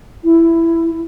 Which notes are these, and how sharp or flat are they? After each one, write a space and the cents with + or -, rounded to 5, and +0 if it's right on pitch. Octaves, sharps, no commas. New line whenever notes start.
E4 +10